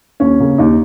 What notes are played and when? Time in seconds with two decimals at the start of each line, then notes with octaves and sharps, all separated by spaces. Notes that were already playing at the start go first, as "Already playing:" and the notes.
0.20 D#2 C#4
0.40 C#3 A#3
0.58 D#2 D#4